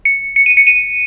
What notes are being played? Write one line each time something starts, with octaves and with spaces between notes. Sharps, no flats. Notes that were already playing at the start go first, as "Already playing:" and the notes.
C#7
C#7
D#7
C#7
D#7